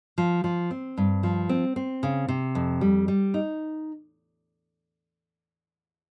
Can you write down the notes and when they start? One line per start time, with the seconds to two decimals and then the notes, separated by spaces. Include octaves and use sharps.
0.18 F3
0.44 F3
0.71 C4
0.97 G2
1.23 F3
1.49 C4
1.76 C4
2.03 C#3
2.28 C3
2.55 F2
2.81 G3
3.08 G3
3.34 D#4